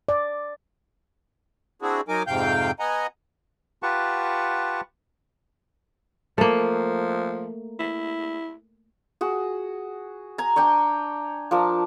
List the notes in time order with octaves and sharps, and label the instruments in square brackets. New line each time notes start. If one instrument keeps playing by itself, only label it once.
[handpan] D5
[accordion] C4 D4 E4 F#4 G#4
F#3 D#4 A#4 G#5 D6
F2 G#2 C3 F5 G5 G6
B3 D#5 F#5 G#5 A#5
[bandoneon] F4 G4 B4 F#5 A5 C#6
[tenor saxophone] F3 [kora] A3 A#3
[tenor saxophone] E4
[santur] F#4 G#4
G#5 A#5
D4 G5 G#5 C#6
F3 D4 A#4 A5